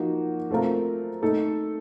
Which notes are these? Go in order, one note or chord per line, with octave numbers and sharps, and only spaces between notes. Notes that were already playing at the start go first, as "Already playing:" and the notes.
Already playing: F3 A#3 D#4 F#4
A3 C4 F4 A#4
A3 D#4 A4